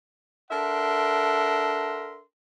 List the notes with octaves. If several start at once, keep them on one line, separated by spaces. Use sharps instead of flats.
D4 A4 A#4 E5 F#5 C6